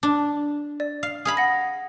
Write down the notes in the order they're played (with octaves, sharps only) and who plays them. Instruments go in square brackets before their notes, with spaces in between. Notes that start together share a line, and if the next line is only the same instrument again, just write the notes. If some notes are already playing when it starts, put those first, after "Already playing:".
[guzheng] D4
[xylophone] D5
[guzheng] F5
G#4 F5 B5
[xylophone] F#5 A#6